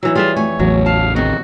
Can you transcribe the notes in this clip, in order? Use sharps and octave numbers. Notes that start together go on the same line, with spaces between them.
E3 F#3 D#4 B4 E6
G3 F4 G#4 A4 B4 E5
F2 A3 C#5 G#5
A1 E2 F#3
F5 A5
D#3 C4 F#4 G#4